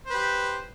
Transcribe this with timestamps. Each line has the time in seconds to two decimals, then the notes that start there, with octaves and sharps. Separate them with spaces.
0.06 C5
0.10 B4
0.14 G4